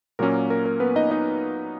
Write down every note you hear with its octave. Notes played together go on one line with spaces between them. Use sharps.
A#2 F#3 A#3 C#4 A#4
A#4
A#4
B3 B4
D#4 D#5
D#4 D#5